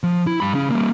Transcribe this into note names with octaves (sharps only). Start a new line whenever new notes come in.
F3
E4
G2 B5
C#3 C#4
G3 A#3